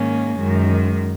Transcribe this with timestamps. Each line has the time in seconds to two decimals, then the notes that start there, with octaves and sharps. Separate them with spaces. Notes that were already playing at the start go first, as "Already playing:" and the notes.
Already playing: G#2 D#3 A#3 C#4
0.39 F#2 D#3 G#3